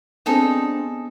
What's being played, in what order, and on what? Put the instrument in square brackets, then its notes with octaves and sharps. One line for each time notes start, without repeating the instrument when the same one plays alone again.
[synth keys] B3 C4 D4 [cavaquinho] D#4 G#4 A4